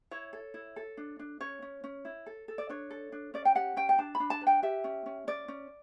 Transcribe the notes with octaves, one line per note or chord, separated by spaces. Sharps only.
E4 C#5
A4
E4
A4
D4
D4
C#4 C#5
C#4
C#4
E4
A4
A4
D5
D4 C#5
A4
D4
C#4 D5
G5
G4 F#5
C#4 G5
G5
D4 A5
B5
D4
A5
B4
G5
G4 E5
C#4
C#4
C#4 D5
C#4